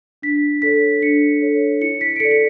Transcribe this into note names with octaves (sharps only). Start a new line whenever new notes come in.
D4 B6
A4 C#5 B6
D4 C#7
A4 C#5
E4 C#7
B6
D7
A4 D5 C#7
C#7